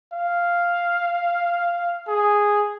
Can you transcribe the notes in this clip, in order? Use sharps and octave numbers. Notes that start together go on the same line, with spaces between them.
F5
G#4